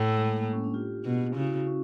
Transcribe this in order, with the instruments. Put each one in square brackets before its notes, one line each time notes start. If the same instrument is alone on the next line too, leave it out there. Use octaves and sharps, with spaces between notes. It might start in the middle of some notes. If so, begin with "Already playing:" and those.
Already playing: [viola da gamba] A2
[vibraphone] G#3
A#3
A#3
C#4
D4
F4 G4
[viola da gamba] B2
[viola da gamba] C#3 [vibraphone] E4 F#4
[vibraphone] E4 F#4
C#4